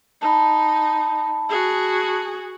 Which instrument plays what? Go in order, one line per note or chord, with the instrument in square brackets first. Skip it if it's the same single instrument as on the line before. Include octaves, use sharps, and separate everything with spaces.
[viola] D#4 [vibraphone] A5 B5
[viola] F#4 G#4